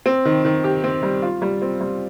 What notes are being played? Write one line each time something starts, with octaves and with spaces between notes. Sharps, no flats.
C4
D#3
D#3
G4
C4
G3
F4
G3
C4
G3